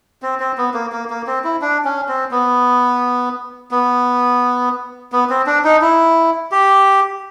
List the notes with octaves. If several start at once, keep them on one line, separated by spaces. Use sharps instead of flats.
C4
C4
B3
A#3
A#3
A#3
C4
E4
D4
C#4
C4
B3
B3
B3
C4
D4
D#4
E4
G4